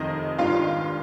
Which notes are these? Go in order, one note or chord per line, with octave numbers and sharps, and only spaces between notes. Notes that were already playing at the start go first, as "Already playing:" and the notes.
Already playing: F1 F2 D#3 D#5
G#1 G2 D#3 G3 F4 F5